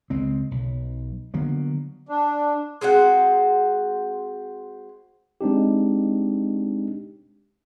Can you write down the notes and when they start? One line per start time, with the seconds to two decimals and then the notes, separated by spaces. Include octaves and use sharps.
0.10 C#2 G#3 C4
0.51 B1
1.34 D3 F#3 A#3 B3
2.09 D4
2.81 G#3 C4 F#4 F#5
5.41 G#3 C4 D4 D#4 G4